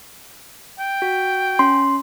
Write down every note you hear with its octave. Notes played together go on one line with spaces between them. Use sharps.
G5
F#4
C#4 C6